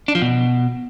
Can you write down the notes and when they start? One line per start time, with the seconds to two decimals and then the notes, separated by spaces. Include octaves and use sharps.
0.08 D4
0.15 F3
0.22 B2